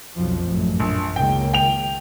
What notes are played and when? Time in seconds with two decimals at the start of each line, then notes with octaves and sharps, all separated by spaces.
0.15 B1 F2 F3
0.45 A1 F#2
0.80 A#1
1.16 C#2 D#3 A#3 G5
1.54 G5 F7